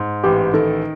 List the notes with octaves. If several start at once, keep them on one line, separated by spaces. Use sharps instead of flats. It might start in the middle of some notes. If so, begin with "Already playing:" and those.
Already playing: G#2
A1 G4
D#3 A4